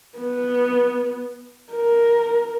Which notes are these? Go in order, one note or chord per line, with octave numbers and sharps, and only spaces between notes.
B3
A#4